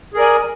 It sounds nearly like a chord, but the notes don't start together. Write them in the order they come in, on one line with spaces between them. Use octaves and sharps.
G#4 A#4 D5 G#5